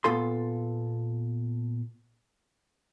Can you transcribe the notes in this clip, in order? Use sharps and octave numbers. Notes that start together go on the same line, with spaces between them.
A#2 B3 F4 A4 C6